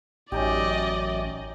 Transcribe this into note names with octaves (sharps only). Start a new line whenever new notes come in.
A1 F#2 C#4 D#4 G4 D5 D#5